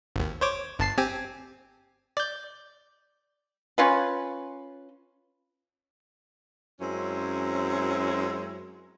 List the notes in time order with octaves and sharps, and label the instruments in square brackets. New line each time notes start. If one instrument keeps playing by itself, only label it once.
[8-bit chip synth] G#1 D#2
C5 C#5 D6
G1 A5 C7
C4 G4 G#5
D5 G6
[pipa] C#4 F4 B4
[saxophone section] F#2 G#3 C4 C#4 E4